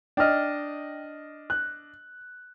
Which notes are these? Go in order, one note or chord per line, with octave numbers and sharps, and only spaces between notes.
D4 D#5 G5 F6
F#6